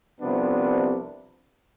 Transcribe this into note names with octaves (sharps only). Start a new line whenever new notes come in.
C2 C3 F3 B3 D4